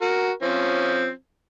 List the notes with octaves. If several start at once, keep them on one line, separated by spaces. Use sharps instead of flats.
F#4 A#4
F3 C4 C#4